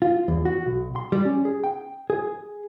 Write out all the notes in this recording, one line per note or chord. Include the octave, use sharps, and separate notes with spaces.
F4
E2
F#4
B1
C6
G3
C#4
G#4
G5
G#4